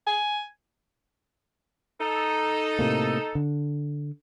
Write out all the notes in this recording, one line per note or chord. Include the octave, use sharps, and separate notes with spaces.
G#5
D#4 A4
A2 C3 A#3
D3